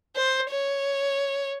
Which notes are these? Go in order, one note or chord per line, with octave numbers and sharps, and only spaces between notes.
C5
C#5